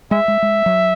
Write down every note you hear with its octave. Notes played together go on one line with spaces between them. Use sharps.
G#3 E5
G#3
G#3
F#3